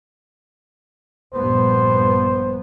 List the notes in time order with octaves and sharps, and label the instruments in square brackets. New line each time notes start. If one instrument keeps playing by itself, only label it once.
[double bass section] A#1 G2 B3 [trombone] C5